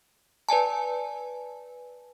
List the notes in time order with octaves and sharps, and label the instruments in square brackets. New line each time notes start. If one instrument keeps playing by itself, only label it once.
[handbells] B4 D5 G#5 A5